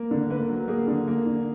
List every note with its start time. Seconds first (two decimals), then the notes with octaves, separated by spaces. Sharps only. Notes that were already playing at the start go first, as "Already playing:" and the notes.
Already playing: A#3
0.11 D3
0.30 A#3 B4
0.49 F#3
0.68 A#3 G#4
0.88 D3
1.08 A#3
1.27 D3